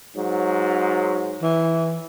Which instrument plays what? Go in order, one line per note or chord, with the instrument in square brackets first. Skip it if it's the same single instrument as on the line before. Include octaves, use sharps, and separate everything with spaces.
[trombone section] G#2 F#3
[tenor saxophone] E3